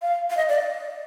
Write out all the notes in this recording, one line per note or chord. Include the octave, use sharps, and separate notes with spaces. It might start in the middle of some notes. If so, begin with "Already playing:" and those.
F5
F5
D#5
D5